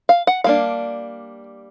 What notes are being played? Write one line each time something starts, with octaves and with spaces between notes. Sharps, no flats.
F5
F#5
G3 A#3 D4 F5